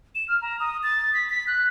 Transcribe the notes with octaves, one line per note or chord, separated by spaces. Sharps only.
E7
F6
A#5
D#6
A6
B6
B6
F#6